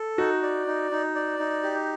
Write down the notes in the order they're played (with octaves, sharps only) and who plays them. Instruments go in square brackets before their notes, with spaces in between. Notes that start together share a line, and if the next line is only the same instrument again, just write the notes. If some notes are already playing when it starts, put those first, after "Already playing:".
Already playing: [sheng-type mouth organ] A4
[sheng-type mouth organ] D#4 [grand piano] F#4
[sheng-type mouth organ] D5
D#4
D#4
D5
D#4
G4